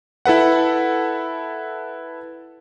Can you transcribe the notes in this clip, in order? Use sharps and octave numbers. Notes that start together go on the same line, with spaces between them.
E4 A4 B4 F#5